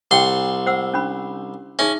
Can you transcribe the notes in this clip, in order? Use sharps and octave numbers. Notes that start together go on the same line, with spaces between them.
C2 F#5 G5 C6
C5 F#5 E6
C#4 D4 B5
C#4 D#4 G#4 E5